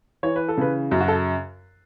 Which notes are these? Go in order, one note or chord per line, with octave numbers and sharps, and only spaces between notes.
E3 C#5
B4
A4
C#3 B4
F#2
F#4
A4